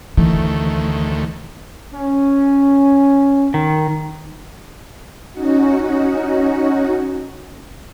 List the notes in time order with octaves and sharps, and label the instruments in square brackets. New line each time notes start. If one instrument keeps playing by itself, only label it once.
[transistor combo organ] D2 D#3 A3 [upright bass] E3
[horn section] C#4
[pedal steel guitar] D#3
[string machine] C#4 D#4 F#4